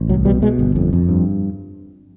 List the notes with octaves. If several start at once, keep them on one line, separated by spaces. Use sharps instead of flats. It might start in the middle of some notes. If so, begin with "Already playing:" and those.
Already playing: A1
C2 F#3
B2 G3
B2 G#3
G1
F2
F2
G2